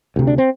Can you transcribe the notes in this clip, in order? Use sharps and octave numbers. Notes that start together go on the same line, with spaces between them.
D2 C3
D4
C4